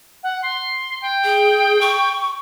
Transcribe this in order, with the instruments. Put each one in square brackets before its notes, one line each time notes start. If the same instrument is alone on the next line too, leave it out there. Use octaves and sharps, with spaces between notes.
[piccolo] F#5
C6
G5
[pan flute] G#4
C#6